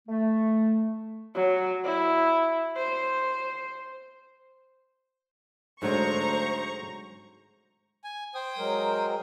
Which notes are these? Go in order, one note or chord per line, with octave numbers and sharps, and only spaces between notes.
A3
F#3
E4
C5
D2 G#2 F#3 G#3 C5 A#5 C#6
G#5
C5 G5 D#6
F#3 G#3 A#4